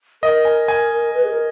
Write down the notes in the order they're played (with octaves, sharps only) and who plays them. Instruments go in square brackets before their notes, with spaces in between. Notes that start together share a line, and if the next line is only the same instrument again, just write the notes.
[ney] A#4 [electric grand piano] D#5
[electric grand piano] G#5
G#5
[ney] B4
G#4
A#4